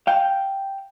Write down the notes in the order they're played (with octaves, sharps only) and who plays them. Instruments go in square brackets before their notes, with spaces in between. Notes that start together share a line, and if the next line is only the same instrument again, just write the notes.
[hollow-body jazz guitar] F5 G5